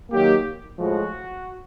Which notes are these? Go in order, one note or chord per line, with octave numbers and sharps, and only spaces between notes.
D#3 F#3 A#3 G4
A2 F3 G#3 F#4